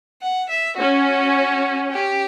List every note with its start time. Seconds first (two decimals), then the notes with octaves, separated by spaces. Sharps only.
0.21 F#5
0.50 E5
0.78 C#4 F#4
1.91 G4